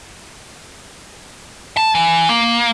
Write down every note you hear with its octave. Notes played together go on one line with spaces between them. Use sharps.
A5
E3
A#3